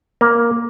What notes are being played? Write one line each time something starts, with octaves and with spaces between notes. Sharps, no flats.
A#3